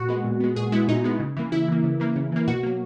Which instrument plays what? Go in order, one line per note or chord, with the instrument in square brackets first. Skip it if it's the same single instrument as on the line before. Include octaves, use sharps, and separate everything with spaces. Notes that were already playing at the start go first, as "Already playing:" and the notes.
Already playing: [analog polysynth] A#2 F#4
G#3 B3
A#2
G#3 B3
A#2 G#4
G#3 B3 E4
A#2 D#4
G#3 B3
C#3
E3 A#3
C#3 E4
E3 A#3
C#3
E3 A#3
C#3
E3 A#3
B2 F#4
F#3 A#3